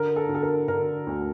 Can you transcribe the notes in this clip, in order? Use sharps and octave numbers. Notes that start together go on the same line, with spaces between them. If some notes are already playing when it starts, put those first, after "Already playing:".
Already playing: D3 A#4
A4
D3
A4
A#4
D3 A#4
D2